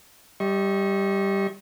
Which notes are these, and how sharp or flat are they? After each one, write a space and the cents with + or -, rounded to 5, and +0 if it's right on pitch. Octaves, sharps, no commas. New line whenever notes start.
G3 +0 D#5 +40 C#6 -25